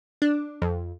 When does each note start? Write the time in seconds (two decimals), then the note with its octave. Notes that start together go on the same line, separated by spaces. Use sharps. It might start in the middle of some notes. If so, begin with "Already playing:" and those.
0.22 D4
0.62 F2